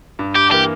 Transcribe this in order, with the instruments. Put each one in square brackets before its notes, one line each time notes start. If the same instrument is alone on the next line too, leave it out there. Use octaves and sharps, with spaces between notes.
[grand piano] G2
[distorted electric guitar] G4
[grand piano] E3 A#3 [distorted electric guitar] G4